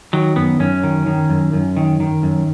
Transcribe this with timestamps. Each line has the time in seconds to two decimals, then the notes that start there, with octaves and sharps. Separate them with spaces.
0.13 D#3 F#3
0.36 F#2 B3
0.59 F#2 C#4
0.83 D#3
1.07 D#3
1.30 F#2
1.53 F#2
1.77 D#3
2.00 D#3
2.23 F#2